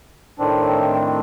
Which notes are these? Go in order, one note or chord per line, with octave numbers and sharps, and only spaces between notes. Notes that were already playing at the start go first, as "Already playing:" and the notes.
A2 D#3 C4 D4